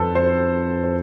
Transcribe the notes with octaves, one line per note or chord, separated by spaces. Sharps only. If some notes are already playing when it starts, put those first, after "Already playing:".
Already playing: F2 A4 B4 C5
C5
C5